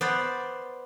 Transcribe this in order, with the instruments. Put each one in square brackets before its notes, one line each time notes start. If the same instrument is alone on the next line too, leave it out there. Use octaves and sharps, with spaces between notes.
[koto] B3 C5 D5